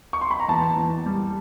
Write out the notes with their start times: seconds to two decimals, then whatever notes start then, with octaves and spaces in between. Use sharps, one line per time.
0.13 C#6
0.21 C6
0.31 B5
0.40 A#5
0.48 E2 A5
0.76 E2
1.06 G3